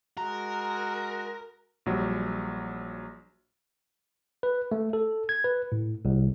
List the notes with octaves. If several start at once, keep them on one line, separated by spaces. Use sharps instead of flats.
G#3 F#4 A#4
A#1 F#3 G3
B4
A3
A4
G#6
B4
A2
C2